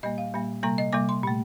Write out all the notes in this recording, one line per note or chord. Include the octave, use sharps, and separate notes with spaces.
A#2 G3 A#3 D#5
F5
A#2 G3 A#3
C3 G3 A#3 A#5
D#5
C3 G3 A#3 D6
C6
A#2 A3